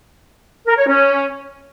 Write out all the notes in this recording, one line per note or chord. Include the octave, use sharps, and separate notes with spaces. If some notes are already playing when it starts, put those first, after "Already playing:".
A#4
C#5
C#4